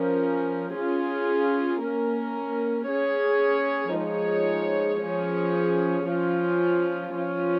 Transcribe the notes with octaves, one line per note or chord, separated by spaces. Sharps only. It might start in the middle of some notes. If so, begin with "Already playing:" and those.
Already playing: F3 C#4 A#4
C#4 F4 G#4
A#3 C#4 A#4
C#4 G#4 C#5
F3 G#3 D#4 G#4 C#5
F3 C#4 G#4 C#5
F3 C#4 F4
F3 C#4 F4